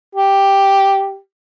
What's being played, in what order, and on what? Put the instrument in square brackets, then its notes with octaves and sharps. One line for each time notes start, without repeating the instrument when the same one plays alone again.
[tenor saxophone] G4